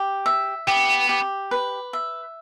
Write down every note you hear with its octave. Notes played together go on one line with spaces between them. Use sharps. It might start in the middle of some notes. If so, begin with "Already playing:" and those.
Already playing: G4
E5
B3 G4
G4
B4
E5